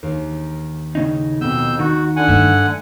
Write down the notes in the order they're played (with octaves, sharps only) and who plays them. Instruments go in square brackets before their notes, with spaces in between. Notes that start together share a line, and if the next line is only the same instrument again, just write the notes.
[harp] D#2
[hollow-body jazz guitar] A2 C#3 D#4
[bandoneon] F2 E6 G6 [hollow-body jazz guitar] B2
[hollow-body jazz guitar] D#3 [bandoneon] F#4
[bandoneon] D3 F#5 G#5
[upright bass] G2 A3 [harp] E5